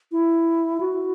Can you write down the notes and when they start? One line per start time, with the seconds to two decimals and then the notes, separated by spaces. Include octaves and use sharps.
0.12 E4
0.81 F#4